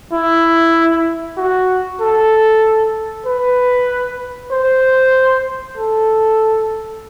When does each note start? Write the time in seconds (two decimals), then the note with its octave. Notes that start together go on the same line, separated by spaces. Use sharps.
0.13 E4
1.37 F#4
2.01 A4
3.26 B4
4.52 C5
5.78 A4